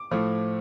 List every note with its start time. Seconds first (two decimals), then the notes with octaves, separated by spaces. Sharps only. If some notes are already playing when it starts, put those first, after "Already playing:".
Already playing: D6
0.11 A2 F3 A3